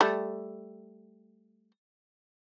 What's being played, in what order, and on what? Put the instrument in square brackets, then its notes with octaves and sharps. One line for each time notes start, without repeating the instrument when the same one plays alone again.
[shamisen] G3 A3